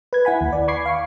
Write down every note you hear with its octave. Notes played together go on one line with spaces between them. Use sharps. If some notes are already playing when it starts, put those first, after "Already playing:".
B4 G#6
E4 F#5 G#5 B5
D#2
D5
B5 C#6 D6 G#6 C7
F5 C#6